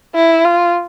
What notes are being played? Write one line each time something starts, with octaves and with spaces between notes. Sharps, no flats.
E4
F4